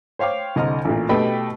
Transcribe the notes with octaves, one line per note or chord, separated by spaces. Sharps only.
C5 C#5 F5 G5 D6
C2 D3 D#5 A#5 F6
A1 A#2
B2 A3 G4 D#5 G5 B5